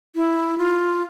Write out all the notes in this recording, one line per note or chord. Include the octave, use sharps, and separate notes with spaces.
E4
F4